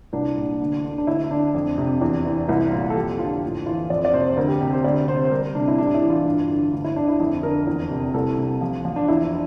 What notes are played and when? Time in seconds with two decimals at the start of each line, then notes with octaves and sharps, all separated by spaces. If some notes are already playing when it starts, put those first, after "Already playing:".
0.13 C2 D4
0.37 A#2
0.60 D2
0.84 D3
0.98 D4
1.07 D2 E4
1.30 D3 D4
1.54 F2
1.78 C3
2.01 E2
2.25 E3
2.48 C2 E4
2.72 A#2 F4
2.90 A4
2.96 F2 G4
3.19 D3 F4
3.43 A2
3.66 E3 F4
3.90 F2 D5
4.05 D5
4.13 C3 C5
4.28 C5
4.37 D2 A#4
4.48 G4
4.61 C3 G4
4.72 C5
4.84 D2 D5
5.08 C3 C5
5.25 C5
5.31 G3 A#4
5.55 C3 D4
5.68 E4
5.78 A2 D4
5.94 E4
6.02 E3
6.10 F4
6.25 G2
6.49 D3
6.73 D2
6.84 E4
6.96 D3 D4
7.08 E4
7.20 F2 E4
7.43 D3 A#4
7.67 E2
7.91 C3
8.14 C2 A4
8.38 C3
8.61 F3
8.85 F3
8.96 D4
9.08 E2 E4